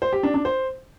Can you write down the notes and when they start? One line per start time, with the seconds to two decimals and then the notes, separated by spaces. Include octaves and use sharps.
0.02 C5
0.13 G4
0.23 D4
0.34 D4
0.45 C5